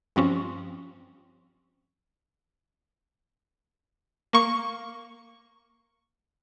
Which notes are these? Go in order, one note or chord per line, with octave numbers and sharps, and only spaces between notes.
G2 F3 C4 C#4
A#3 C#6